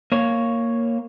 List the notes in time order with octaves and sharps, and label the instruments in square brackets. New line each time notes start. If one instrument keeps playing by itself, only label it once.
[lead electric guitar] A#3 C#5